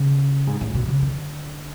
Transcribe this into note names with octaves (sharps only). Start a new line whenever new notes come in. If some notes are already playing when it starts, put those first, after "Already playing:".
Already playing: C#3
G#2
A2
B2
C#3
D3